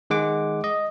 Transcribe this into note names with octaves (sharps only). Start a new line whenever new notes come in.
D#3 G#3 F#5 D6
D#5